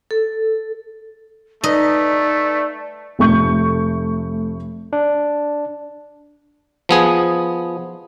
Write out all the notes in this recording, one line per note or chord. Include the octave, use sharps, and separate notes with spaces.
A4
A3 D#4 B4 D5 D#5 B6
F1 A3 C#6 G6
D4
F3 B3 G#4